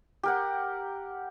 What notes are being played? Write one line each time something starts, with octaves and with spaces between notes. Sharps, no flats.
G4 A#4 F#5